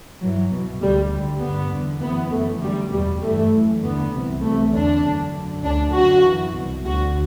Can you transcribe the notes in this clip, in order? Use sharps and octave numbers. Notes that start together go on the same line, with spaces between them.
G2 E3 F#3
C2 B2
D2 D3 G3
D2 D3
G2 D3 B3
E2 D3
F#2 E3 B3
F#2 E3 A3
F#2 D3 G3
E2 B2 G3
G2 E3 A3
F#2 E3
E2 D3 B3
C2 C3 E3
C2 C3 E3 A3
E2 D3 D4
F#2 D3
F#2 D3
D2 D3 D4
F#2 D3 F#4
F#2 E3
C2 B2
D2 D3 F#4